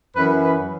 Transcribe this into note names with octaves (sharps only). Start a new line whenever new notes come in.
F#2 E3 B4
B4